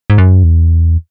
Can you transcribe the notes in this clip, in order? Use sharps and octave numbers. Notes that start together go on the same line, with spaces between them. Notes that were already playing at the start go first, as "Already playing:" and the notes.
G#2
F#2
E2